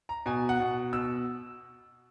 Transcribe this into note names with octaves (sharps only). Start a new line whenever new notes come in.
A#5
B2 G#5
F#5
B2
B2 E6